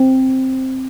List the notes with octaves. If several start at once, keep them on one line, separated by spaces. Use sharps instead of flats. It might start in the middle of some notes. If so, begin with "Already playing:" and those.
Already playing: C4